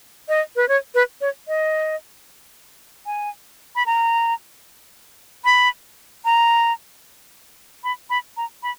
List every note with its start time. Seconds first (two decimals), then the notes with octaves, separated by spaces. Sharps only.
0.29 D#5
0.56 B4
0.69 C#5
0.95 B4
1.21 C#5
1.48 D#5
3.06 G#5
3.76 B5
3.86 A#5
5.45 B5
6.25 A#5
7.84 B5
8.10 B5
8.37 A#5
8.63 B5